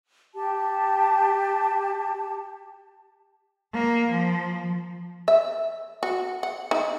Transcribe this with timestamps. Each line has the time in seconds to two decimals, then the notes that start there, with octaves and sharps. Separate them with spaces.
0.34 G4 A5
3.74 A#3
4.11 F3
5.28 E5
6.03 F#4
6.43 F#5
6.71 D#4